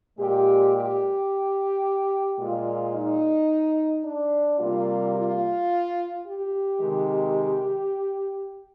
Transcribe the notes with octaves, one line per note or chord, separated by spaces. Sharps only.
A#2 G#3 G4
G4
A#2 G#3 F4
D#4
D4
C3 G3 A#3 F4
F4
G4
C3 D#3 G#3